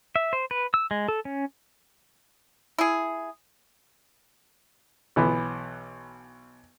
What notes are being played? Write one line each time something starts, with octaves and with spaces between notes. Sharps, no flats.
E5
C5
B4
E6
G#3
A4
C#4
E4 G#4
B1 E3 B3